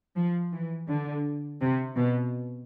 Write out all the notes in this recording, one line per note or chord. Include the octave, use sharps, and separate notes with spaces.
F3
E3
D3
C3
B2